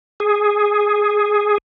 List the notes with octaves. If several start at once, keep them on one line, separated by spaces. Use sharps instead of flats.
G#4